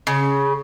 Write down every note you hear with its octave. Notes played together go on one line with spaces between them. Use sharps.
C#3